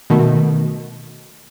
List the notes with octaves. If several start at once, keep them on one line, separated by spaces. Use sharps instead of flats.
B2 D#3 A3